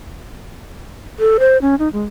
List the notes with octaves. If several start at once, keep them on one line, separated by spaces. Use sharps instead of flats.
A4
C5
C#4
D#4
G#3